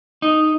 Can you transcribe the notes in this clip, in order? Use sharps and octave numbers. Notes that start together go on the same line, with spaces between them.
D#4